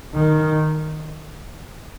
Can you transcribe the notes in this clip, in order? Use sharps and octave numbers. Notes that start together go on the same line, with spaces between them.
D#3